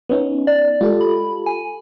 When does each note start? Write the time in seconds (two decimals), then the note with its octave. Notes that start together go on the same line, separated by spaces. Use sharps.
0.09 B3 C#4 D#4
0.47 D5
0.81 G#3 F4 G4 A4
1.01 B5
1.46 G#5